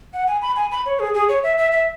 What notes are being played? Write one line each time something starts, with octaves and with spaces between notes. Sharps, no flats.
F#5
G#5
B5
G#5
B5
C#5
G#4
G#4
C#5
E5
E5
E5